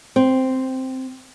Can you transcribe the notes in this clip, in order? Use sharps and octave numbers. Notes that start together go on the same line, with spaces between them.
C4